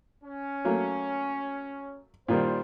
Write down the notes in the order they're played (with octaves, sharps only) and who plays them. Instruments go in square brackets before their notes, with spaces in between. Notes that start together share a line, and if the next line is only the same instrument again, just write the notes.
[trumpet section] C#4
[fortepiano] F#3 A3 A#3
[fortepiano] A#2 D#3 G3 [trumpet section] C5